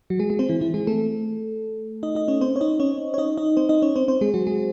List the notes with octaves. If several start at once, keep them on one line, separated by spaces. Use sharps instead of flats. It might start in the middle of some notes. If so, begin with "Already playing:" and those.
F#3 F#4
G#3 G#4
G#3 G#4
C4 C5
E3 E4
E3 E4
G#3 G#4
A3 A4
D#4 D#5
D#4 D#5
C#4 C#5
C4 C5
C#5
D#4 D#5
C#4 C#5
C#5
D#4 D#5
D#4 D#5
C4 C5
D#4 D#5
C#4 C#5
C4 C5
C4 C5
G#3 G#4
F#3 F#4
G#3 G#4